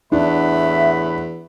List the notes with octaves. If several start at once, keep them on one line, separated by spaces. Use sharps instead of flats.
E2 A2 D4 E5 F#5 B5